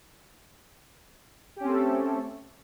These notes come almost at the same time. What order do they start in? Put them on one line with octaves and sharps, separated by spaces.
G4 C#4 C4 A3 A4